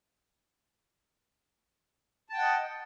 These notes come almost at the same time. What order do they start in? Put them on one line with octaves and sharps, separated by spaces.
A5 G5 F#5 D#5